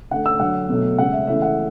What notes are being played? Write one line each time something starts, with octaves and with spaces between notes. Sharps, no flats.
D3 A3 F#5
E6
D3 F#3 A3 F#5
B2 F#3 A3
C#3 G#3 F#5
E5
C#3 E3 A3 E5
F#5